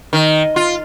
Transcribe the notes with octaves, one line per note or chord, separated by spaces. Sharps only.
D#3
F4